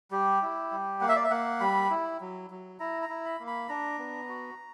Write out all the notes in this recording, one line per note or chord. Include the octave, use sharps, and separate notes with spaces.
G3 G4
E4
G3
A#3 F#5
E5
D5
E5
A#3 F#5
G3 B5
E4
F#3
F#3
E4 A#5
A#5
E4
B5
A#3
B5
D4 A#5
B3
F#4